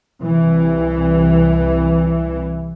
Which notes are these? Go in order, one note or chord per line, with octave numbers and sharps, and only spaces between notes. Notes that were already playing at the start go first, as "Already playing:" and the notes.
C2 E3